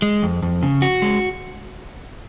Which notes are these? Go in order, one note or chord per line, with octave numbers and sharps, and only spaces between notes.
G#3
F2
F2
C#3
F#4
G#3